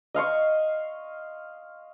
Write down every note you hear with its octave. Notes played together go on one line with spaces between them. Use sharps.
D#5 F5 C6 C#6